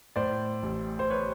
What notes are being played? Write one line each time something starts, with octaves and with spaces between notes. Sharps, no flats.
A2 C5 D5
A1
C5
B4 C#5